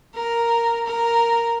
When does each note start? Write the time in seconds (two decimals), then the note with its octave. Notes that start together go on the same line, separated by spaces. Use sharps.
0.15 A#4
0.86 A#4